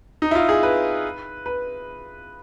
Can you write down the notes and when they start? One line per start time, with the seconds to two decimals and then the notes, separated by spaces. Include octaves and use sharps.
0.22 D#4
0.31 E4
0.35 F4
0.49 G#4
0.63 B4
1.46 B4